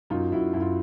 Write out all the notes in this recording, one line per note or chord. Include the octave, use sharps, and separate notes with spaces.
F#2 D#4 F4
F#2 E4 F#4
F#2 E4
F4